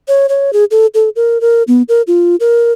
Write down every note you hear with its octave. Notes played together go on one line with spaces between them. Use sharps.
C#5
C#5
G#4
A4
A4
A#4
A#4
B3
A#4
F4
A#4